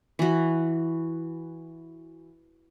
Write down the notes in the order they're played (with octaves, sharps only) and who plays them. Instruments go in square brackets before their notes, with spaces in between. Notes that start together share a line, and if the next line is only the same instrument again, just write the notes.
[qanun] E3 F#4